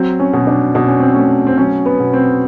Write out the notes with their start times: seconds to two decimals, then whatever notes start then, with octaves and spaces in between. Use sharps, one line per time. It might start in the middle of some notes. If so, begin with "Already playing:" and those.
Already playing: F#3 C4
0.20 C#4
0.33 B2
0.47 D4
0.75 B2 D4
0.87 C#4
1.00 C4
1.13 A3 C#4
1.47 C4
1.57 F#3 C#4
1.86 B3
1.99 B2
2.13 C4